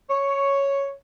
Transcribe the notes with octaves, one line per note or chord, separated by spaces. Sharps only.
C#5